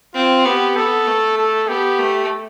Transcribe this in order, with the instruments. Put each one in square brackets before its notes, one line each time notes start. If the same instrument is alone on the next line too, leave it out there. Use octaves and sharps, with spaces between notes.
[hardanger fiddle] C4 [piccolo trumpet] F4
[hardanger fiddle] B3 [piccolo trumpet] G4
[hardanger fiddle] B3 [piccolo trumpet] A4
[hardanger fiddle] A3
[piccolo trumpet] A4
[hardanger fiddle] B3 [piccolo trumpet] G4
[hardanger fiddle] A3